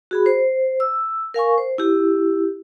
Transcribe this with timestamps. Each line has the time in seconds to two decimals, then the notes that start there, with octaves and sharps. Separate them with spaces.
0.11 F#4 G#4 B5
0.26 C5
0.80 E6
1.34 A#4 F5 G#5 C#6
1.58 C5
1.78 E4 G4